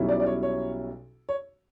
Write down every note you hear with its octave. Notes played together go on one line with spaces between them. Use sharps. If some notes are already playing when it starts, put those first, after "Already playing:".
Already playing: B1 B2 G3 C#4 E4
D5
D5
C#5
C#5
C#5